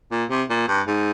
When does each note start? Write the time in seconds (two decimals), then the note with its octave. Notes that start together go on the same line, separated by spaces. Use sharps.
0.11 A#2
0.30 C3
0.50 A#2
0.68 G2
0.87 G#2